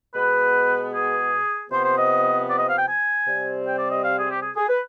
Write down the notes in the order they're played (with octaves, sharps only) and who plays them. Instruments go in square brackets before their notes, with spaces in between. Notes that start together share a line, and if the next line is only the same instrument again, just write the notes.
[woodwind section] B2 G#3 B3 B4
G#4
C3 F3 B3 C5
C5
D#5
D5
D#5
F5
G5
G#5
C3 G3 C4
G5
D5
D#5
F5
G#4
G4
G#4
G#4
B4